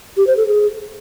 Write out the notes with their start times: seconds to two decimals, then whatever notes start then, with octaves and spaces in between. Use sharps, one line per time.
0.17 G4
0.27 C5
0.37 A4
0.47 G#4